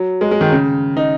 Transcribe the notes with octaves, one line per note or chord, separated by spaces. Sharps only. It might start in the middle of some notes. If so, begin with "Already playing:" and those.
Already playing: F#3
G#3
G#3
D#3
C#3
D#4